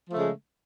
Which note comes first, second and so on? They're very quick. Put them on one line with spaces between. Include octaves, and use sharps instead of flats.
F3 A3 C#3 G#3